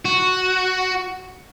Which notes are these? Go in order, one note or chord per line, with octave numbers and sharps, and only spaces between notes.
F#4